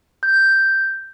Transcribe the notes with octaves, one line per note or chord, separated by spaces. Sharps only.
G6